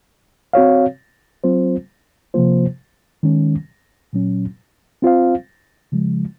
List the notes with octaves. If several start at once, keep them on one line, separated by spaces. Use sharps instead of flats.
C4 F#4 C#5 F5
F#3 C4 F4 C5
C3 F3 A#3 F4 C5
D#3 G#3 C#4
A#2 F#3 C#4
C4 F4 C5 F5
C#3 F3 G#3